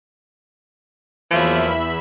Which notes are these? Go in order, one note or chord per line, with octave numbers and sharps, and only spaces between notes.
E2 F3 F#3 A#3 E5 B5